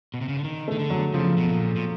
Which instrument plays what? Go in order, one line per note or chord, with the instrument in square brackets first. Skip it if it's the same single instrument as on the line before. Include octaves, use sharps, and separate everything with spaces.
[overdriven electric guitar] B2
C3
C#3
D3
D#3
[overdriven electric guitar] D#3 [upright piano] A3
[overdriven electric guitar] D3
[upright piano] F#3
[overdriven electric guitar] C#3 [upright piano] F3
[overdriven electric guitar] B2
A#2
A#2